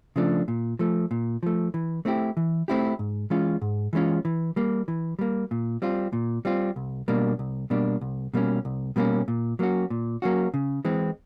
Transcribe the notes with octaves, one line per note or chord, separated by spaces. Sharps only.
C#3 F3 A3 D4
A#2
F3 A3
A#2
F3 A3
E3
A3 C4 E4 G4
E3
A3 C4 E4 G4
G#2
E3 G#3 C#4 F4
G#2
E3 G#3 C#4 F4
E3
G3 A#3
E3
G3 A#3
A#2
G3 C4 F4
A#2
G3 C4 F4
C2
B2 G3 A#3 D4
C2
B2 G3 A#3 D4
C2
B2 G3 A#3 C#4
C2
B2 G3 A#3 C#4
A#2
F#3 A#3 C#4 F#4
A#2
F#3 A#3 C#4 F#4
C#3
E3 G#3 C4